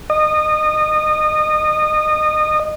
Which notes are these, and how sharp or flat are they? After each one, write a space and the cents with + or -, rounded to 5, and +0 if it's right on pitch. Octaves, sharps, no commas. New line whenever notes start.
D#5 -25